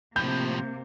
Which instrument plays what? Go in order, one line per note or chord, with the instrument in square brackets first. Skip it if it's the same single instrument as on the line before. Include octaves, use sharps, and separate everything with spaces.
[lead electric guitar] A2 F3 [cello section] C3 A#3 [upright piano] G6